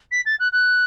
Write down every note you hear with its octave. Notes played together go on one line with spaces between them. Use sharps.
B6
A6
F#6
F#6